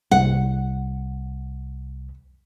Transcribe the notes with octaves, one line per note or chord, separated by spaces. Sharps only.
C2 F#5